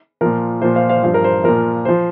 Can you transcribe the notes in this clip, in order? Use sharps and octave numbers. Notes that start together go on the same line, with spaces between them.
A#2 F3 A#4
A#2 F3 C5
C5 F5
C5 F5
G2 F3 C5
A#4
C5
A#2 F3 A#4
F3 C5